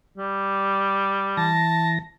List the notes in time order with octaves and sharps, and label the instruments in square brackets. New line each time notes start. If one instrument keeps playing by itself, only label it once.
[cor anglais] G3
[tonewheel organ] E3 A#6 [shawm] A5